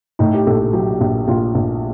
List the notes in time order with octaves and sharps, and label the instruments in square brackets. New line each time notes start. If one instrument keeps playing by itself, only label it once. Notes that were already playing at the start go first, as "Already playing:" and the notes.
[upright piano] A2 D#4
G4
A#1 A4
A4
F#3 G4
A#1
A#1 F4
A#1